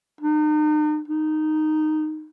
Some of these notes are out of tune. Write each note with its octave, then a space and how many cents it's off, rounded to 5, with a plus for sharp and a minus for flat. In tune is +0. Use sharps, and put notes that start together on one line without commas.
D#4 -40
D#4 -10